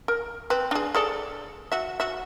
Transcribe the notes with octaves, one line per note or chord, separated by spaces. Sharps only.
A#4
C4 B4
D4 G#4
G#4 A4 D5
F#4 E5
F#4 E5